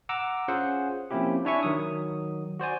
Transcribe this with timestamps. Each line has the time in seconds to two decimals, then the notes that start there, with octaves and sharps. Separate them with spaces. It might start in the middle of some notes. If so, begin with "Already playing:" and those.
0.09 F#5 A#5 D6 E6
0.48 C#4 F4 G#4 C5 F#5
1.11 F3 A#3 C4 C#4 E4 G4
1.45 D4 E4 C#5 E5 G#5 C#6
1.63 D#3 F#3 D#6
2.60 F#4 C5 D5 G#5